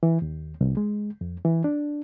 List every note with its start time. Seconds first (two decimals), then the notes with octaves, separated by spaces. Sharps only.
0.03 E3
0.22 D#2
0.61 C2
0.77 G#3
1.21 F2
1.45 E3
1.64 D4